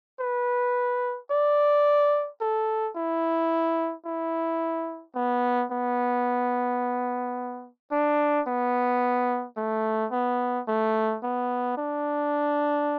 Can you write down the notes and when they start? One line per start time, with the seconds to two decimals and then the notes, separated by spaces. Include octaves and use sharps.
0.20 B4
1.30 D5
2.41 A4
2.96 E4
4.06 E4
5.15 B3
5.71 B3
7.92 D4
8.47 B3
9.57 A3
10.12 B3
10.68 A3
11.23 B3
11.77 D4